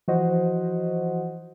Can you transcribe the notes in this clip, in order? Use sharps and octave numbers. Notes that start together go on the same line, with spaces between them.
E3 F3 F#4 C5 D#5 F#5